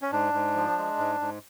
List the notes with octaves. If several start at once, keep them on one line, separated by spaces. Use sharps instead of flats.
C#4
G#2 D4
G#2
F3
G#3
G#2
G#2